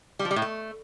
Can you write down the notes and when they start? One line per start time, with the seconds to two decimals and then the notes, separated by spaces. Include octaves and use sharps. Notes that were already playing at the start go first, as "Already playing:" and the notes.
0.19 G3
0.25 F3
0.31 G3
0.36 A2
0.42 A3